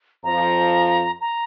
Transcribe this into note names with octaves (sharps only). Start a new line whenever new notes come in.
F2 F3 A#5
A#5